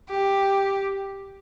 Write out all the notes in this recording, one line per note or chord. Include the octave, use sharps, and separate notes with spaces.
G4